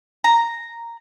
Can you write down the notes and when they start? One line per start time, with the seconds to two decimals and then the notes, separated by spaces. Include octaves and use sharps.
0.24 A#5